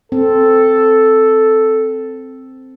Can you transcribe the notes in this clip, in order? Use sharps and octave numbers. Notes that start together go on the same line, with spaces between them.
C4 A4